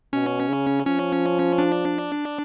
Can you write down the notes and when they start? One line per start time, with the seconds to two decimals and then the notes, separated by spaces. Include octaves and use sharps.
0.13 B2 C#4
0.49 C#3
0.86 F3 C#4
1.58 D4